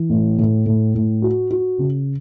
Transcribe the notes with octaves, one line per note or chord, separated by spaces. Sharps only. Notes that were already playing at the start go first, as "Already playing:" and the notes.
Already playing: E3
A2
A2
A2
A2
F#4
F#4
C#3